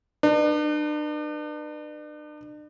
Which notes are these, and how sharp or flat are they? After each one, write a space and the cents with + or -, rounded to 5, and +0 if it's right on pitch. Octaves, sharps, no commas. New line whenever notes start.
D4 +40 B4 -15